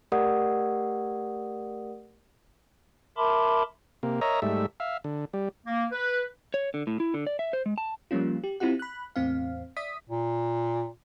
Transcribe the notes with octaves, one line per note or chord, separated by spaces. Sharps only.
A3 G4 A#4 D5 F#5 D#6
A#4 E5 A5 B5 C6 D6
C3 A#3
A#4 C#5 D#5 E5 A#5
G#2 G3 A3 E5
E5 F5
D3
G3
A#3
B4
C#5
D3
A2
E4
D3
D5
E5
C5
G#3
A5
F3 G3 A#3 C#4 F4
G4
C4 E4 F4 G4 F#5
B5 F#6
E2 A2 C4 F5
D5 E5 D#6 B6
A#2